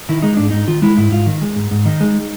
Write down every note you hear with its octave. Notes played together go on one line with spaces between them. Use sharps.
D#3 E4
G#3 D#4
G#2 D4
G#2 D#4
D#3 F4
G#3 E4
G#2 E4
G#2 F4
D#3
G#3
G#2
G#2
D#3 D#4
G#3